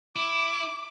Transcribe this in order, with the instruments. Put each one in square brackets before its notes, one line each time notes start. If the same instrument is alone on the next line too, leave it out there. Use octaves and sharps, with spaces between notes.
[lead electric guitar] E4 [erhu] D6